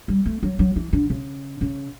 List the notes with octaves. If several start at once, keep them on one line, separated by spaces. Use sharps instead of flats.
G3
A3
F#3
F#3
E3
D3
C#3
C#3